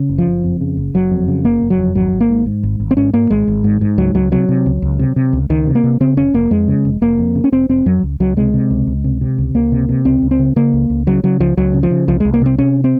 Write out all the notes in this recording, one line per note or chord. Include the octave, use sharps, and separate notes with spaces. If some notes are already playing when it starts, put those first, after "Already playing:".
Already playing: C#3
F#1
F3
F#1
F2
C#3
F#1
F#1 F#3
F2
C#3
F#1 A#3
F#1
F#3
F2
G#1 F#3
G#1
A#3
G#2
G#2
G#1
G#1
C4
G#2 C#4
G#2 A#3
G#1 G#3
G#1
G#2
G#2
C#2 F#3
C#2 F#3
C3 F#3
C3
C#2
C#2
C3
C3
C#2
C#2 D#3
C3
A#3
C3
C#3 C4
F1 C#4
F1 A#3
F2 G#3
C#3
F1
F1 A#3
F2
C#3
C#4
F1 C4
F1 C4
F2 F#3
C#2
C#2 F#3
C3 G#3
C3
C#2
C#2
C3
C3
C#2
C#2 A#3
C3
C3
C#2 C4
C#2
C4
C#3
C#3 A#3
C#2
C#2
C#3 F#3
C#3 F#3
C#2 F3
C#2 F#3
C#3
F3
C#3
C2 F3
C2 G#3
A#3
C3 C4
C3 C#4
C4